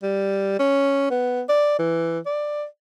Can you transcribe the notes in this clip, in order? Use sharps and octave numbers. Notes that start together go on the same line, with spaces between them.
G3
C#4
B3
D5
E3
D5